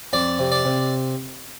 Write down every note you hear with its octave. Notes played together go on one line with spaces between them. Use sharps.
F2 D5
C3
D5
C3